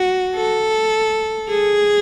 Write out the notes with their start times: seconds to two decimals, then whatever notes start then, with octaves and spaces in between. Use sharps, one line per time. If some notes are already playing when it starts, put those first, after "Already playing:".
Already playing: F#4
0.35 A4
1.50 G#4